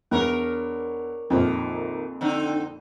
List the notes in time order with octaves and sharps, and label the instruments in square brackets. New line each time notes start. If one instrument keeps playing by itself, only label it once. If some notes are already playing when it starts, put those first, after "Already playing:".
[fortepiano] E2 [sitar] D4 A#4 C#5
[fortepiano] A#1 F2 [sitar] D#3 A#3
[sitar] D3 C4 D#4